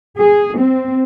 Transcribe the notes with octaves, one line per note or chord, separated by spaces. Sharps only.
G#4
C4